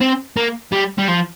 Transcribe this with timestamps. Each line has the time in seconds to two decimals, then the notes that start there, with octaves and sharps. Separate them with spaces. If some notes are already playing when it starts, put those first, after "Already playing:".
0.01 C4
0.36 A#3
0.72 G3
0.98 G3
1.08 F3